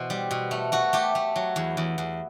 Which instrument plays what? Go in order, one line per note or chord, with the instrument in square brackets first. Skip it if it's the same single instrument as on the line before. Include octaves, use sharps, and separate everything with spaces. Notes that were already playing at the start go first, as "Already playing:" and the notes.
Already playing: [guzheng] B2 E3 C5
G3
B2
A3
A3 F#4
A3 G4
A3
F#3
E2
E2
E2